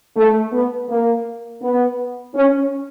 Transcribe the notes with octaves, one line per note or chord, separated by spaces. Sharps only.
A3
B3
A#3
B3
C#4